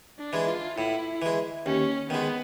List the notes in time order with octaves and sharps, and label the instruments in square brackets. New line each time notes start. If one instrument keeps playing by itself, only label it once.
[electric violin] D4
[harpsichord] E3 G#3
[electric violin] F4
[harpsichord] A2 [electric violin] E4
[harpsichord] E3 G#3
[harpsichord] D#2 [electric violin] C#4
[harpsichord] D#3 G#3 [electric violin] B3